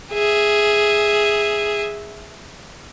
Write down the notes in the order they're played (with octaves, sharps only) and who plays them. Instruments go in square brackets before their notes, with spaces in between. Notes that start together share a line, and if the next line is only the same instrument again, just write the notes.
[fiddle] G#4 E5